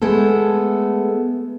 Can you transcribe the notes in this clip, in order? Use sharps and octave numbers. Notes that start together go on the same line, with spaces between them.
G#3 A3 B3 A4